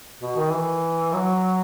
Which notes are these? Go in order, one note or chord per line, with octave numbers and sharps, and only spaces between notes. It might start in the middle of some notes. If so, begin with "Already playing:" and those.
B2
D#3
E3
F#3